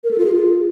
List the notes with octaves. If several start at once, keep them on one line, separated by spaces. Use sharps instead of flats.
A#4
A4
F4
G#4
F4